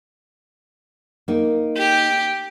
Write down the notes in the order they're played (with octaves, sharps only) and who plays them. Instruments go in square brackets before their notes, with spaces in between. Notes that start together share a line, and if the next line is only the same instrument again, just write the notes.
[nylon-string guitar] A#3 D#4
[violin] G4